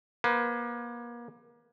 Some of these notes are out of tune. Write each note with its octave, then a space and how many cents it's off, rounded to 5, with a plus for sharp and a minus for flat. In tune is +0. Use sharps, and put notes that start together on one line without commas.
A#3 +35 B4 +35